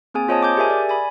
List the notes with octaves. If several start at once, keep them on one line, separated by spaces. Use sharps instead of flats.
A#3 C4 G#4 G#5
F4 C5 C#5 D#5 A5 D#6
D6 G6
G4 G#4 A#4 E5 G#5
D5
G#5 B5